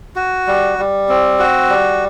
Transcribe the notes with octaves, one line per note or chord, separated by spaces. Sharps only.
F#4
G3
G3
C4
F#4
G3